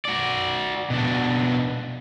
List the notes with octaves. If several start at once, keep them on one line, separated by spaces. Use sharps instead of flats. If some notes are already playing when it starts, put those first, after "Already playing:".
F#4 D5
B2 D4